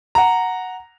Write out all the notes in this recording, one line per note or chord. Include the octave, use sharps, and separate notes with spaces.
F#5 A#5